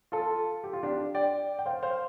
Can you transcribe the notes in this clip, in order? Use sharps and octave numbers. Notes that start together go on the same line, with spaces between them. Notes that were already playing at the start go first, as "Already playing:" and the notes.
F4 A4
G4
F4
D4 G4
D5 G5
G5
C5 F5
C5 F5